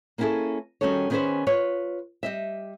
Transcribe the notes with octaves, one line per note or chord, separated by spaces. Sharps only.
A#3 B3 C#4 E4 G#4 A4
D#3 G3 C#4 F#4 A4 C#5
D#3 B3 C#4 G#4 B4 C5
F4 B4 C#5
G3 D#5 E5